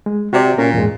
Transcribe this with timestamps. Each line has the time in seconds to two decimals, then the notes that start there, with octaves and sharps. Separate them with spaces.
0.06 G#3
0.33 C3 F#4 C5 D5
0.58 A#2 C#4 A#4
0.74 E2 G#2 G#3